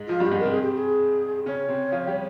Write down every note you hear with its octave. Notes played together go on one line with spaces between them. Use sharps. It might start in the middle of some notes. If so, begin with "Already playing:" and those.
Already playing: G#2 G#3
F3 F4
G2 G3 G4
G#2 G#3
C3 C4 A#4
G#4
G4
G#4
C#3 C#4 C#5
C3 C4
F3 F4
G3 G4